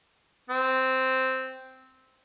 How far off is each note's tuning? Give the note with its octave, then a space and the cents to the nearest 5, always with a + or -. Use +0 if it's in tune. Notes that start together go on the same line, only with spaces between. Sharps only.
C4 -5